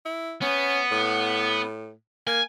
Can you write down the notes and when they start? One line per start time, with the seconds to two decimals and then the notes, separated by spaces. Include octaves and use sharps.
0.05 E4
0.42 B3 C#4
0.91 A2
2.27 A#3 G#5